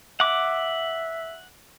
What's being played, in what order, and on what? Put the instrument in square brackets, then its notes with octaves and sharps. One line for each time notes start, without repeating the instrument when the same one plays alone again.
[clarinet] E5 [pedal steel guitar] F#5 D6